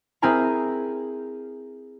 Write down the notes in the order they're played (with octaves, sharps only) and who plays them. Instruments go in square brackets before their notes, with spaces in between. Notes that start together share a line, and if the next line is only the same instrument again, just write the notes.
[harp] C4 E4 G#4 A#4 G#5 A#5